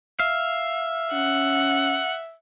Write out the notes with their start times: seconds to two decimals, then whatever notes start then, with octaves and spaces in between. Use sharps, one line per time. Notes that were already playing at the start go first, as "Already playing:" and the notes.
0.20 E5 F5
1.13 C#4 F#5